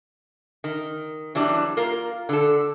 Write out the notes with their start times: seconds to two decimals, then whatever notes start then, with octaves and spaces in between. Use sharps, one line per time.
0.64 D#3
1.35 E3 F#3 G3 B3 D4
1.77 A#3 F4 A#4
2.29 D3 A4